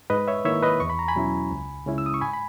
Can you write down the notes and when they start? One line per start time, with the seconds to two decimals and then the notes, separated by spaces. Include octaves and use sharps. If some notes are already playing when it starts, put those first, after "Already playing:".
0.10 G#2 B4 D#5
0.28 C#5 E5
0.45 D#3 A#3 E4 C#5 E5
0.63 B4 D#5
0.80 E2 C#6
0.90 B5
0.99 A#5
1.08 G#5 B5
1.16 B2 F#3 C#4 E4
1.51 C#2
1.86 C#3 G#3 C#4 E4
1.98 E6
2.06 D#6
2.14 C#6
2.21 G#2 G#5 B5
2.33 B5